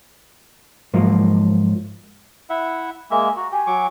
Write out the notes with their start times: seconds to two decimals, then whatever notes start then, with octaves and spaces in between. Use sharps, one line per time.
0.94 G#2 F3 F#3 A#3
2.50 E4 E5 F#5
3.11 G#3 A#3 E5 G#5
3.36 F#4 A#5
3.52 G4 G#5
3.67 F#3 C#6 D6